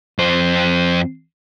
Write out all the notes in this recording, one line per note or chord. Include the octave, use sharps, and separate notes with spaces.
F2 C5